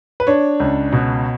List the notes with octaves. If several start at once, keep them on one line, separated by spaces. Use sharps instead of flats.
B4
D4 C#5
C#2
B2